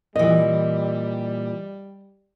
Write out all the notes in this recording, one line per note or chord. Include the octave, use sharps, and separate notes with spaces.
A#2 E3 G3 D#5